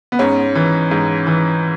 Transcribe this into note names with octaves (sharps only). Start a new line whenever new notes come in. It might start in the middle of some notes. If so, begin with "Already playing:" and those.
B3
G#2 C#4
E3
G#2
E3